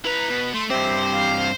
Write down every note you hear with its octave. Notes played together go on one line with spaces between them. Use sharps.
E4 B4 A#5
B2
A3 C6
G2 C4 G4 C5 E5
F5